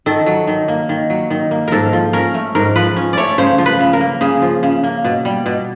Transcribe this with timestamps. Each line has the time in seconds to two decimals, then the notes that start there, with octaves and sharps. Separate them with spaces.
0.06 D#3 A4
0.26 F#3
0.47 D#3
0.68 A#3
0.89 D#3
1.10 F#3
1.30 D#3
1.51 A#3
1.68 G#2 A4 A#4
1.93 F3
2.13 C#4 A#4
2.34 A3
2.55 G#2 A#4
2.76 F3 B4
2.96 C#4
3.13 A3 C#5 D5
3.38 C#3 C5
3.58 F3
3.66 B4
3.80 C#3
3.93 A#4
4.01 A#3
4.21 C#3 G#4
4.42 F3
4.63 C#3
4.83 A#3
5.04 B2
5.25 G3
5.46 B2